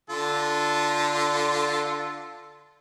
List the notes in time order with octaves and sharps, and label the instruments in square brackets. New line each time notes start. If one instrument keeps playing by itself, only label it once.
[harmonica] D3 F4 A4